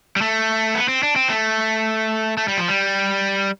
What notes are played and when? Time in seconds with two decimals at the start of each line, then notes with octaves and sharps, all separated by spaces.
0.16 G3
0.21 A3
0.75 B3
0.88 C4
1.03 D4
1.16 C4
1.30 A3
2.37 A3
2.48 G3
2.58 F3
2.68 G3